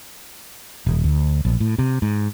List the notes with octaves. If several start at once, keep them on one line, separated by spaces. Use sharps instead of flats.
D#1
D2
A#1
A2
C3
G#2